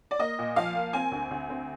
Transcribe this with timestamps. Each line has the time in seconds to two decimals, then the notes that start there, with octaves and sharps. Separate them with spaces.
0.11 D5
0.19 A#3 D#5
0.39 A#2
0.56 F3 F5
0.75 A#3
0.93 C4 G#5
1.12 D2
1.31 D2
1.49 C4